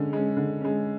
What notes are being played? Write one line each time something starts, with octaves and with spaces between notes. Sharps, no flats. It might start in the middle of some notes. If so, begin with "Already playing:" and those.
Already playing: D3 G#3 C#4
G#3 C#4
D3
G#3 C#4